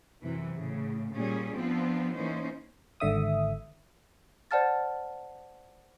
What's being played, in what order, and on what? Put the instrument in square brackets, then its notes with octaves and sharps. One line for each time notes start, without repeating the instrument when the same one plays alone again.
[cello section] F#2 C3 E3 F#3
A2 C#3
A#2 G3 C#4 G#4
F3 B3 C4 D4 F4
E3 A#3 C#4 D#4 C5
[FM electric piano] G#1 D3 E5 D#6
[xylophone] C5 D5 F#5 A5 F6 A6